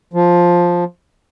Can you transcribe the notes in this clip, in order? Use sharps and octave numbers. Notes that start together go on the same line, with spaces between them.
F3